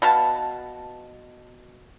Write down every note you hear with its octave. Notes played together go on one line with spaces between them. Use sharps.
B2 F5 A5